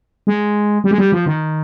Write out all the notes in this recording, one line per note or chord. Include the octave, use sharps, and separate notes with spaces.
G#3
G3
G#3
G3
F3
D#3